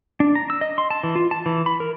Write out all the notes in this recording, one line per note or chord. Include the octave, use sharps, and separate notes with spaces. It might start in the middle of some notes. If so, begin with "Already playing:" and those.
D4
A#5
E6
D#5
C6
A5
E3
F4
A5
E3
B5
A#4